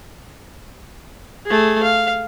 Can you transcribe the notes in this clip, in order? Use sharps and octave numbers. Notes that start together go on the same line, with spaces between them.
A3 G#4
F5